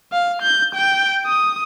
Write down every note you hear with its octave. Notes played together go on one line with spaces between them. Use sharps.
F5
G6
G5
D#6